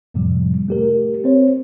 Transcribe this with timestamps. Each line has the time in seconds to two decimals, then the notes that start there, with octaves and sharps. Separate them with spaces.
0.14 F2 A2 C3 F3 G3
0.68 A3 G4 A#4
1.24 C4 C5 C#5